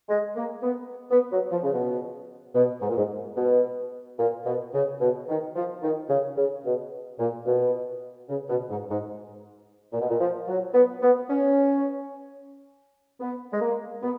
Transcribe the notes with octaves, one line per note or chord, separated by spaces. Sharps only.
G#3
A#3
B3
B3
F#3
F3
C#3
B2
B2
G#2
A#2
G#2
B2
A#2
B2
C#3
B2
D#3
F3
D#3
C#3
C#3
B2
A#2
B2
C#3
B2
G#2
G#2
A#2
B2
A#2
F3
F#3
B3
B3
C#4
B3
G#3
A#3
B3